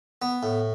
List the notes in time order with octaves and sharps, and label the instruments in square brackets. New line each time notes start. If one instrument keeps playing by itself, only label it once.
[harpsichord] B3
A2